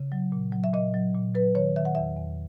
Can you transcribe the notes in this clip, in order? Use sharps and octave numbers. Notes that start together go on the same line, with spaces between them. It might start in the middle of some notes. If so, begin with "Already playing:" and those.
Already playing: C#3
F#3
A#2
F#3
E5
A#2 D#5
F#3
A#2
F#3 B4
D#3 C#5
D#3 E5
F#5
E2 E5
E2